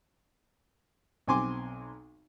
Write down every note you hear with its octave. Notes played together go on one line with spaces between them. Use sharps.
B1 C4 G#5 C6 D6